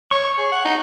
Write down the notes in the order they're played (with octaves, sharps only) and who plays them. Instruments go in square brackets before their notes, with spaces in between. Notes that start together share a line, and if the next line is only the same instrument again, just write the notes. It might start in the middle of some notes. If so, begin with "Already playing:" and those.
[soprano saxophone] C#5 [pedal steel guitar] C#6
[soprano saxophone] G#4
F#5
D#4